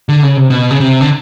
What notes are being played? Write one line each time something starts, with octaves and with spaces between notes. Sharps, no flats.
D3
C#3
C3
B2
C#3
C3
D3